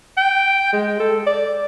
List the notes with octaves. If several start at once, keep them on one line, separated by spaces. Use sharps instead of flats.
G5
G#3
A4
D5